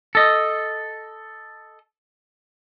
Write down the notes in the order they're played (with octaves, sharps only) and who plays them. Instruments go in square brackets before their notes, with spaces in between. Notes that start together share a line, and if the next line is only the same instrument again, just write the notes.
[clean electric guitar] A4 D#5